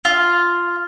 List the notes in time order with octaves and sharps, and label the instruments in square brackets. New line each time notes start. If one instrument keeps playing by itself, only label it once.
[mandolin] F4